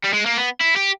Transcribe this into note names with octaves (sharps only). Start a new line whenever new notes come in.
G3
G#3
A#3
B3
E4
G4